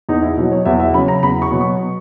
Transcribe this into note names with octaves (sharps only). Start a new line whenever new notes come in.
E2 D#4
E4
B2 F#3 D#5
C#5
E2 E5
E5
C#3 F#3 B5
A#5
E2 B5
C#6
B2 F#3
C#6